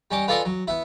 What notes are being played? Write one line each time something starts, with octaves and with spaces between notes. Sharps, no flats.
G3 C#4 D#5 D6
B3 F4 A4 D5 D#5 G#5
F#3
B3 E4